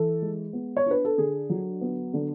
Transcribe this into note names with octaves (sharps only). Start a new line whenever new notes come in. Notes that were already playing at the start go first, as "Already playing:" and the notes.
Already playing: E3 A4
G#3
B3
C#5
D4 B4
A4
D3 G#4
F#3
B3
D3